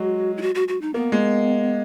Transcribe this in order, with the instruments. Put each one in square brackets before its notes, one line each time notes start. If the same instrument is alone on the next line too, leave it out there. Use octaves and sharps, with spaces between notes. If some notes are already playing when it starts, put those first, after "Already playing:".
Already playing: [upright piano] F#3 G#3 [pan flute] F#4
[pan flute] E4
F#4
F#4
F#4
D#4
[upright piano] A#3 [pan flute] B3
[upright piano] G#3